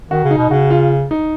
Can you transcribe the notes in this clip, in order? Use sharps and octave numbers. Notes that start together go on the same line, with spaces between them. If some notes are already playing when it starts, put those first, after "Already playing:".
D#3 F#4
C#3
D#4
B2
C#3 F#4
F4
D#4